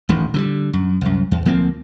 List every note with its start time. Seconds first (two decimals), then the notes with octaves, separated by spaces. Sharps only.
0.09 D#1 A1 D#3
0.34 D3 E3 G3
0.73 F#2
1.01 C2 F#2
1.31 E2
1.46 D2 F3 A#3 C4